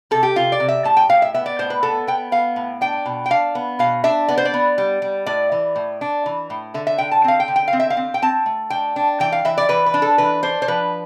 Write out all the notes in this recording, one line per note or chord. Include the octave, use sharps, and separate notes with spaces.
C3 A4
G4
C3 F4
D5
C3
E5
A2 A5
G5
A2 F5
E5
B3 E5
D5
A2 C5
B4
B3 A4
B3 G5
B3 F5
A2
D4 G5
B2
G5
D4 F5
B3
B2 F5
D4 E5
B3 D5
C5
D5
B3
G3
G3
A2 D5
E3
A2
D4
E3
A2
D3 E5
E5
D3 G5
A5
C4 F5
G5
D3
G5
F5
C4
E5
F5
C4
G5
C4 A5
A3
D4 G5
D4
E3 G5
F5
E3 E5
D5
E3 B4
B4
D4
A4
E3 B4
D4 C5
C5
F3 B4